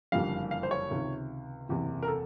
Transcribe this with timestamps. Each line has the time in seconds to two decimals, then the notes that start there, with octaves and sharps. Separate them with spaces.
0.12 F#1 F2 D3 G3 F5
0.51 F5
0.63 C5
0.71 C#5
0.91 C#2 C3 D#3
1.69 F#1 E2 C3
2.03 A#4
2.08 A4